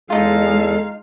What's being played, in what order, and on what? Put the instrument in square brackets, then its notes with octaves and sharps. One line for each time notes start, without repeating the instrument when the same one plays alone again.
[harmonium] E2 A4 [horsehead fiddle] G#3 F5 [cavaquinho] D#4 F4